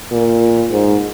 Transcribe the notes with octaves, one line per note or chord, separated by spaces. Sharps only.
A#2
G#2